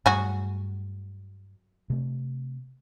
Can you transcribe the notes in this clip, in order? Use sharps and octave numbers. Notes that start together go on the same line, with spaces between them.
G2 F#3 G3 A3 F#4 G#4
C3 A3